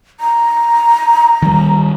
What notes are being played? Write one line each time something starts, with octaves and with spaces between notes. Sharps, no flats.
A#5
D#3 G3